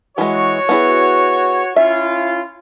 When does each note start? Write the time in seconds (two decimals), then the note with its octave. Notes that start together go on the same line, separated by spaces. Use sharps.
0.18 E3 G#3 F#4 C#5
0.69 B3 E4 G#4
1.76 C#4 E4 F4 E5